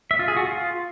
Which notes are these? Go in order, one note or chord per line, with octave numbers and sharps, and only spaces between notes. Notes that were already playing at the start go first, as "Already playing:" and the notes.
E5
F4
G#4
F#4
F4